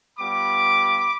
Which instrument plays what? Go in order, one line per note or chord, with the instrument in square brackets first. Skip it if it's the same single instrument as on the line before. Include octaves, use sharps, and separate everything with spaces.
[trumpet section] G3 B3 F4 B5 D6